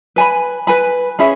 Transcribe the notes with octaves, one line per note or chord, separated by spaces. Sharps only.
B4 G#5 B5
B4 G#5 B5
C#4 G#4 E5 B5